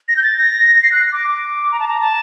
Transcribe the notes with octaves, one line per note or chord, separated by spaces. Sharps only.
A#6
G6
A6
A#6
C7
F#6
D6
D6
A#5
A5
A#5
A5